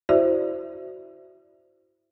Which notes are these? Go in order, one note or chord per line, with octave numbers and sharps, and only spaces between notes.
E4 F#4 C5 D5 E5